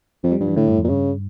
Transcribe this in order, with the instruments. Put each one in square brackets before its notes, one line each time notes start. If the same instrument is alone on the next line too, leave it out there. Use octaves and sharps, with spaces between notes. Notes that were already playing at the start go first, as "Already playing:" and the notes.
[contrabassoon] F2 [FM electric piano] F3
[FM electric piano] G3
[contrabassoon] G2 [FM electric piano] F3
[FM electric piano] E3
[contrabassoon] A2 [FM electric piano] D3
[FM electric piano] G2
F2
[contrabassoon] A#2
[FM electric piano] G2 [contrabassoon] C#3